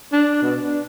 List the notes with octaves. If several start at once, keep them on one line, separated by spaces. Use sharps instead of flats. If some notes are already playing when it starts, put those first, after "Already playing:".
D4
B2
D4